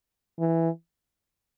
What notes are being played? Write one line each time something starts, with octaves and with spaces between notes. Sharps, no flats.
E3